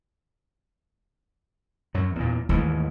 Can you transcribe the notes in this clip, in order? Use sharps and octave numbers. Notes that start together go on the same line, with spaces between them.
F#2 F#3
E2 A#2
D#2 G#2 E3 A3